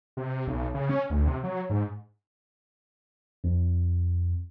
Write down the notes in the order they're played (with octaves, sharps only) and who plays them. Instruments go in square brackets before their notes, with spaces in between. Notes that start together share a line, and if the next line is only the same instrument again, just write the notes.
[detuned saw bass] C3
B1
C#3
C#4
D2
C3
F#3
G#2
[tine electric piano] F2